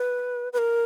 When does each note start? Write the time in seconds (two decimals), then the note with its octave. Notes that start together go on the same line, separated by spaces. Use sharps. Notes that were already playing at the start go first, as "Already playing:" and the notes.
Already playing: B4
0.53 B4
0.58 A#4